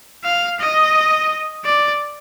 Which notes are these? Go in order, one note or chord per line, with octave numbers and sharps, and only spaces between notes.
F5
D#5
D5